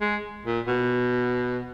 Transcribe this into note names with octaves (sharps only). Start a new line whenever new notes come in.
G#3
A#2
B2